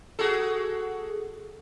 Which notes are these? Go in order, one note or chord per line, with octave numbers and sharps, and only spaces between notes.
F#4 G#4 A4